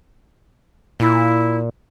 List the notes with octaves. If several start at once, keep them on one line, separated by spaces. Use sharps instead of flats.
A#2 E4